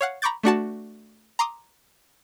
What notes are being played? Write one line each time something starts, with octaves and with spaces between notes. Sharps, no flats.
C#5 F5 F#5
A#5 B5 C#6 D6 G6 A6
A3 D4 F#4 A5
A#5 C6 D6 D#6